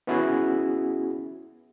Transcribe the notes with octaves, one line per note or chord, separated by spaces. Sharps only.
B3 C#4 E4 F#4 G#4